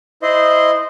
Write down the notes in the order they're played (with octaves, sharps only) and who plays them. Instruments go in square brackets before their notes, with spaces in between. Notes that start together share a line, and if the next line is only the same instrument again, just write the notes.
[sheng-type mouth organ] E4 C5 D#5 C6